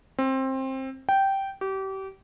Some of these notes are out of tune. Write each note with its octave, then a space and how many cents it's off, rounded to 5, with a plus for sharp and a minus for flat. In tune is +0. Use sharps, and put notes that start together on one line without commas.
C4 +20
G5 -10
G4 -30